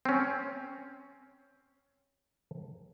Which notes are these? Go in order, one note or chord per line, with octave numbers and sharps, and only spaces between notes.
C4 C#4